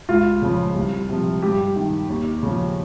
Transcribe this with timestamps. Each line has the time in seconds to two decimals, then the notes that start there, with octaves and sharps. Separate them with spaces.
0.09 C#2 F4
0.42 C#3 F3
0.75 C2
1.09 C3 F3
1.42 G2 G4
1.76 D#3
2.09 D#2
2.43 C#3 F3